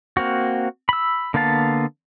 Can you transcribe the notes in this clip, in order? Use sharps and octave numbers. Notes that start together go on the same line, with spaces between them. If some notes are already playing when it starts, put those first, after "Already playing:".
A#3 C4 F#4
B5 E6
D3 A#3 B3 F5 A5